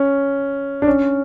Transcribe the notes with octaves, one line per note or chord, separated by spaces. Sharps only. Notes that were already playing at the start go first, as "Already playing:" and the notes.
Already playing: C#4
D4
C#4